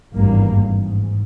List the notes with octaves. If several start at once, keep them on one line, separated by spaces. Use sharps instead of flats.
G#1 E2 G2 A#3
G#2